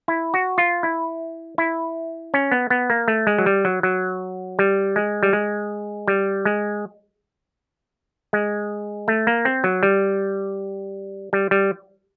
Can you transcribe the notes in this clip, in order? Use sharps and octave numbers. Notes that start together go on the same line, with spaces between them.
E4
F#4
F4
E4
E4
C#4
B3
B3
A#3
A3
G#3
F#3
G3
F#3
F#3
G3
G#3
G3
G#3
G3
G#3
G#3
A3
A#3
C4
F#3
G3
G3
G3